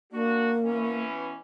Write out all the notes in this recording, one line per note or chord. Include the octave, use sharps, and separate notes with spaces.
A#3 D4 F#4
B2 E3 C#4